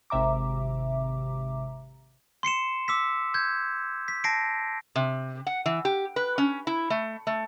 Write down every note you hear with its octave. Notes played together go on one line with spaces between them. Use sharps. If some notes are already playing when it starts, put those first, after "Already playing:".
G#1 C3 E5 A#5 D6
C6 C7 C#7 E7
D6 E6 B6
G6 G#6
B6
A5 A#6 C7 D7
C3
F#5
E3
G4
B4
C#4
E4
A3
A3